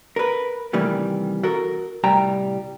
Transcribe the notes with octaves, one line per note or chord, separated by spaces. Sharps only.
A#4 B4
C3 D#3 E3 G3 A3 A#3
F#4 A4 A#4
C2 A2 G3 G5 A#5